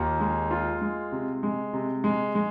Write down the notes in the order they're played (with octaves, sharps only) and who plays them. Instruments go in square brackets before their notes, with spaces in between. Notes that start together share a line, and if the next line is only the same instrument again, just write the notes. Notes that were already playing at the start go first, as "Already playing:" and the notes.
Already playing: [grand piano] D#2 F4
G#3
F4
G#3
C3
G#3
C3
G#3
G#3